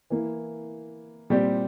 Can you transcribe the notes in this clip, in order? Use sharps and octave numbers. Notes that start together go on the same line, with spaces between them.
E3 A#3 E4
A#2 G3 C4 G4 D5